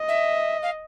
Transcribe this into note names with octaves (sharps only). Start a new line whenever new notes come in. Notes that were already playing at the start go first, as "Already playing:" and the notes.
Already playing: D#5
E5
F5